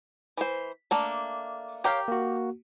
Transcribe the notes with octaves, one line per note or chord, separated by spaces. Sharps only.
E3 C5
A3 A#3 D4
G4 A#4 C#5 F5 G5
A#3 F#4